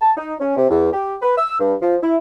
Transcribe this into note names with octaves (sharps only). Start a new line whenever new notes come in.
A5
D#4
C#4
C3
E2
G4
B4
E6
G2
F3
E4